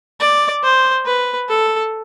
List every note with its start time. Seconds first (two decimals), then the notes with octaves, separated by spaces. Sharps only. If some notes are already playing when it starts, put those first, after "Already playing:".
0.20 D5
0.63 C5
1.06 B4
1.49 A4